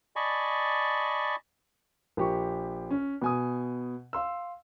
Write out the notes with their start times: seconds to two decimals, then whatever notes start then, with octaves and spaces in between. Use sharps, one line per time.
0.16 D5 D#5 G#5 A5 B5 C#6
2.17 A#1 G4 C#6
2.91 C#4
3.22 B2 G#5 D#6
4.13 F5 C6 E6